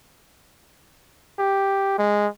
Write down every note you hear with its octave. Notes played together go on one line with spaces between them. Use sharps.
G4
G#3